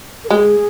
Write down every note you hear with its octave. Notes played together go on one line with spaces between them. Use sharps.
A#4
G#3 G#4